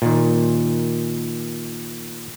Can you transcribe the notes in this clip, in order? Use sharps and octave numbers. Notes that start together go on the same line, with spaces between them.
A#2 D#3